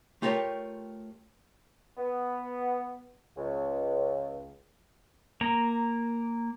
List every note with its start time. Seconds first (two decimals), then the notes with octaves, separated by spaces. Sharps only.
0.22 A3 F4 G4 A#4 C#5
1.98 B3
3.37 C#2
5.41 A#3 A#5